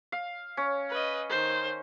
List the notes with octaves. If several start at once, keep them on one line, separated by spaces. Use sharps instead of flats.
F5
C#4
B4 D#5
D#3 C5